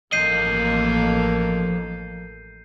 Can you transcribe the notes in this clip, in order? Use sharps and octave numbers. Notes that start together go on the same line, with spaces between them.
A1 F3 A#3 A4 D#5 G6 C7 D#7